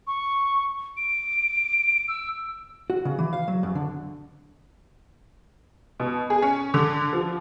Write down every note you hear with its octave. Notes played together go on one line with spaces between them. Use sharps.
C#6
D7
E6
F#4
C#3
E3
F5
F#3
F#2
D3
B2
G#4
C#4
D3
F3